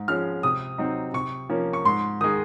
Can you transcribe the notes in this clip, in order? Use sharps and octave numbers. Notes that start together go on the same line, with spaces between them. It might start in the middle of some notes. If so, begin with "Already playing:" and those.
Already playing: G#2
F3 G#3 C#4 F6
C3 D#6
F#3 C4 D#4
C3 C#6
F3 A#3 C#4
C#6
G#2 C6
D#3 G#3 D#6